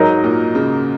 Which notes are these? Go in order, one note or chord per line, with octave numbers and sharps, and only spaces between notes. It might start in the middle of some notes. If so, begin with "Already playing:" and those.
Already playing: G#2 F#3 D#4 A#4 D#5
A#2
C#3